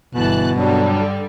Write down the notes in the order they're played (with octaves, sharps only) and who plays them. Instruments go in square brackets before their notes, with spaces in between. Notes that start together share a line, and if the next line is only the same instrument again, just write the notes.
[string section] G1 A5 F#6 [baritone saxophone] B2 [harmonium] E3
[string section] G2 D3 G3 [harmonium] F#3 D4